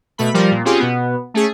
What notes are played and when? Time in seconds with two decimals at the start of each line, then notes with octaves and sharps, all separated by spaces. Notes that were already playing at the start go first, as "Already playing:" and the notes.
0.18 B2 A3 B5
0.34 F3 G3 A#4
0.51 A#2
0.65 C4 C#4 F4 G4 G#4
0.79 B2 B3
1.34 A3 C#4 G#4